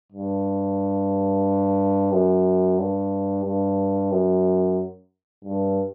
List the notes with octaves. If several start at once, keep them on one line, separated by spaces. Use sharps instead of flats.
G2
F#2
G2
G2
F#2
G2